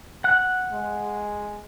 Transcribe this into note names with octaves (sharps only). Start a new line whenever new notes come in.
F#5 F#6
G#3